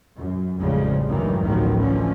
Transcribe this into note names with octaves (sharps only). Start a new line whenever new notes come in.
F#2
A1 F2 C#3 F3 G3 G#3
D2 G2 D#3 E3 F#3 G3
A1 D2 D#3 F3 F#3 B3
D3 E3 F3 C#4